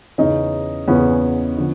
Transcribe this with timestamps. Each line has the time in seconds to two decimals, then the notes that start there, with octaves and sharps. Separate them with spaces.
0.18 E2 C#3 E3 C#4 D#4
0.88 E2 C#3 E3 B3 C#4
1.57 D3 F3